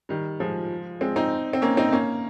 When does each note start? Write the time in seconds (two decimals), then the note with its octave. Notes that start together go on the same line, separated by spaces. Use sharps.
0.09 D#3 G3
0.40 F3 G#3
1.01 G#3 C4
1.16 C4 D#4
1.53 C4
1.62 A#3 C#4
1.77 C4 D#4
1.92 A#3 C#4